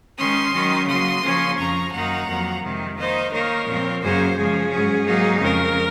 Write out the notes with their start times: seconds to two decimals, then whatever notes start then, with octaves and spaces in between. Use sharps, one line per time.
0.18 D#3 G#3 C#4 C6 D#6
0.53 D#3 F#3 C#4
0.88 C#3 F#3 A#3 C6 D#6
1.23 C#3 F3 A#3 C#4
1.58 F2 C#3 F3 A#5 C#6
1.93 F#2 D#3 A#3 D#4 F#5 A#5
2.28 F2 D#3 F#3 A#3
2.63 F2 C3 D#3 G#3
2.98 D#3 A#3 D#4 C5 D#5
3.32 D#3 A#3 D#4 A#4 C#5
3.68 A#2 F3 C4
4.02 F#2 C#3 F#3 A#3 G#4 C5
4.36 C#3 F3 G#3 G#4
4.71 G#2 F#3 C#4
5.06 G#2 F#3 A#3 D#4
5.41 F2 C#3 G#3 A#4